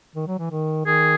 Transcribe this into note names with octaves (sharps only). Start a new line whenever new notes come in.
D#3
F#3
E3
D#3
D#3 G#4